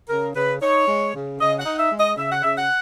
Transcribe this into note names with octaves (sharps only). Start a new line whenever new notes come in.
C#3 A#4
C#3 B4
D#4 C#5
G#3
C#3
C#3 D#5
F#5
D#4
E5
G#3
D#5
C#3 E5
F#5
C#3 E5
F#5